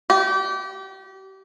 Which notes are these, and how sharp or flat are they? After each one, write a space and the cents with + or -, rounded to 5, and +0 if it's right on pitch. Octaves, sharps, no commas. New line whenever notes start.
G4 -30